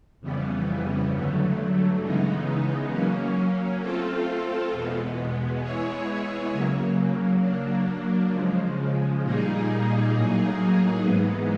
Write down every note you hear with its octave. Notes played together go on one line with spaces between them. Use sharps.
F2 C#3 E3 G3 B3
G2 D3 F#3 A3
C#3 E3 G#3 B3 D#4
F#3 A#3 C#4
A3 C4 F4 A4
E2 B2 G#3 B3
G#3 B3 E4 G#4 C#5
C#3 F#3 A#3
F#3 A#3 D4
C#3 F3 G#3
A#2 G3 A#3 D#4 G#4
A2 F#3 A#3 D#4 G#4
G#2 E3 G#3 B3